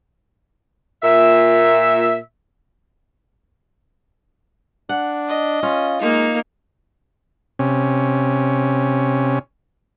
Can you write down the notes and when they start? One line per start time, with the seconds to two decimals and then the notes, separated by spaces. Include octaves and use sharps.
1.03 A#2 E5
4.89 D4 F#5
5.29 D#5
5.63 C#4 F4
6.01 G#3 A#3 D#4
7.59 C3 C#4